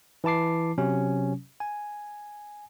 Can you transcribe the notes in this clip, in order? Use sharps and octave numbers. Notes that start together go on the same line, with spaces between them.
E3 E4 A5 D6 C7
C3 F#3 C#4
G#5